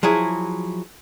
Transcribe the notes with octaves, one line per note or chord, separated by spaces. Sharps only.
F3 F#3 E4 G#4